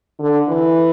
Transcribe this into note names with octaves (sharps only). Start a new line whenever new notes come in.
D3
E3